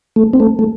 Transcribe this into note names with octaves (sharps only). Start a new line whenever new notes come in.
A3
C4
A3
A3